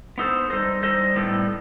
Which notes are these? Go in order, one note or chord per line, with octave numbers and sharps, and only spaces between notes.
B3 D#4 A4 C5
G3 D#4 A4 C5 D#5
G3 D#4 A4 C5 D#5
A2 G3 B3 D#4 A4